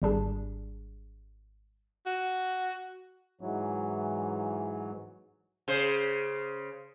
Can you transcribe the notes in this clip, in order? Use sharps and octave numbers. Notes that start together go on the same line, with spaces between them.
G#1 G3 D4 G#4
F#4
G#2 E3 F#3
C#3 C5